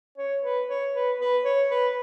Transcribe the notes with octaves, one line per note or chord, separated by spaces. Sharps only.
C#5
B4
C#5
B4
B4
C#5
B4